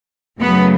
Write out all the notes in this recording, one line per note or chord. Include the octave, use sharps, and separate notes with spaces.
F#2 C#3 F#3 A3 B3